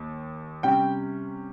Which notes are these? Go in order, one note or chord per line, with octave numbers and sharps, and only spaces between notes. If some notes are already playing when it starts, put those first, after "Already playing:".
Already playing: D#2
C3 G3 C#4 G5